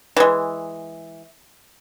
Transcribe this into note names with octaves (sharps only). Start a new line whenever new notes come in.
E3 G#3